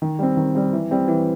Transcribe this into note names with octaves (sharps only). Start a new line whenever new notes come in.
D#3
G3 C4
D#3
G3 C4
E3
G3 C4
E3